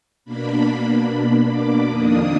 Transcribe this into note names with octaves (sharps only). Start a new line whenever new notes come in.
B2 A#3 D4 B5
D6
F2 D#3 A#3 D4 D#6